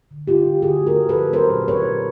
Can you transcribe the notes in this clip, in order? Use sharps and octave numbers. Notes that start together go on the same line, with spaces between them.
D3
D3 F4 G4
D3
D3 F#4 G#4
A3
G#4 A#4
D3
A4 B4
F3
F#3 A#4 C5
A#2
A#2 B4 C#5
A#2